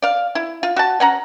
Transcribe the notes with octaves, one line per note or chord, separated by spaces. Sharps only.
D5 F5
E4
F4
F#4 A5
C#4 F#5 A#5